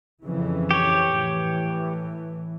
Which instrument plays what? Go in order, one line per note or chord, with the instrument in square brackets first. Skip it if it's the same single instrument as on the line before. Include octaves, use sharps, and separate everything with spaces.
[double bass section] F2 C#3 E3
[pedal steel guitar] G4 C#5
[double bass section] A2 E3